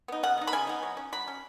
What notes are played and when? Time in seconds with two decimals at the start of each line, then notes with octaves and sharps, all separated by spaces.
0.08 B3 D#4
0.23 C#3 F#5
0.38 B3 D#4
0.47 B5
0.53 C#3 G#5
0.67 B3 D#4
0.83 F#3
0.97 C#4
1.12 F#3 B5
1.28 C#4